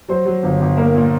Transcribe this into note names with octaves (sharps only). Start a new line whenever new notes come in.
F#3 C5
F#3
G1
G1
A#3 A#4
A#2